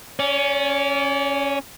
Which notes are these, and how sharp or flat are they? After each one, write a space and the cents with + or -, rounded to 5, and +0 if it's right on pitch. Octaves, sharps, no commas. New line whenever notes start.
C#4 +0 D5 -40